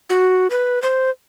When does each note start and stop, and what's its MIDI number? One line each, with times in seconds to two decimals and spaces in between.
0.10 0.47 66
0.50 0.82 71
0.82 1.10 72